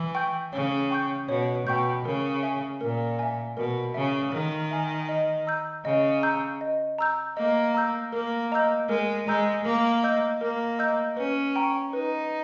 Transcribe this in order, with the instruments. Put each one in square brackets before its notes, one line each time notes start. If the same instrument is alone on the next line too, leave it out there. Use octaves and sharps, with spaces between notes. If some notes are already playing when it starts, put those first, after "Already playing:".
Already playing: [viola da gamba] E3
[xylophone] G5 C#6 G6
[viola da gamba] C#3 [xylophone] C#5
[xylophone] G5 C#6 G6
[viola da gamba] B2 [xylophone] C#5
[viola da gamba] B2 [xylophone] G5 C#6 G6
[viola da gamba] C#3 [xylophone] A#4
[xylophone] E5 G#5
[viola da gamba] A#2 [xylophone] A#4
[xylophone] E5 G#5
[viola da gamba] B2 [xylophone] A#4
[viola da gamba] C#3 [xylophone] E5 G#5
[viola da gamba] D#3 [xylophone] A#4
[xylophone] E5 G#5
D#5
A#5 E6 G6
[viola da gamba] C#3 [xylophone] D#5
[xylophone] A#5 E6 G6
D#5
A#5 E6 G6
[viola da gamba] A#3 [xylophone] D#5
[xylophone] A#5 E6 G6
[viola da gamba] A#3 [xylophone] A#4
[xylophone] D#5 A#5 E6 G6
[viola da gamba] G#3 [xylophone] A#4
[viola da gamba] G#3 [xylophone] D#5 A#5 E6 G6
[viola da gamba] A#3 [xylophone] A#4
[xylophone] D#5 A#5 E6 G6
[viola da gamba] A#3 [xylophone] A#4
[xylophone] D#5 A#5 E6 G6
[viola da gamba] C#4 [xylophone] B4
[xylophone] G5 A#5 C#6
[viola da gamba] D#4 [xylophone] B4